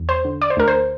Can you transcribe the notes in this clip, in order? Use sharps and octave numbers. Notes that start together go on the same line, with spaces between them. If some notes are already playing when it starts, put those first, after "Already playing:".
Already playing: E2
C5
D3
D5
C5
D2 A#4
C5